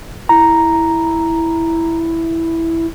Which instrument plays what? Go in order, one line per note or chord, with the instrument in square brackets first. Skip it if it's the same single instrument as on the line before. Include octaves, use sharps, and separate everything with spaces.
[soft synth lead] E4 [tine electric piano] A#5